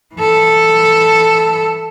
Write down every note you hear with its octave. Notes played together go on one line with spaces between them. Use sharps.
E3 A4